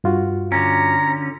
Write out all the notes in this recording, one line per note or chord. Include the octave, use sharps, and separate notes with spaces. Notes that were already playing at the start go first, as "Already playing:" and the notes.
G2 F4 F#4
D3 C#4 A#5